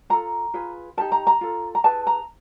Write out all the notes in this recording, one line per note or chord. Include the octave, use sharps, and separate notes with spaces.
F4 A4 A#5
F4 G#4 B4
D#4 G4 A#4 A5
A#5
A#5
F4 A4
A#5
E4 G#4 B4 A5
A#5